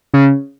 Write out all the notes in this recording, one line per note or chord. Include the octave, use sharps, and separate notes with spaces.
C#3